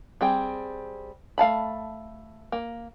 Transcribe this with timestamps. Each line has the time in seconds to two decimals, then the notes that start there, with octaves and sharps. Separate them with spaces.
0.21 G3 C4 G#4 G5
1.38 A3 F5 A5 B5
2.52 A#3